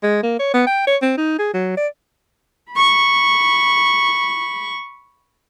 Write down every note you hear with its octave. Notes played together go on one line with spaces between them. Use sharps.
G#3
A#3
C#5
B3
G5
C#5
C4
D#4
G#4
F#3
D5
B5 C#6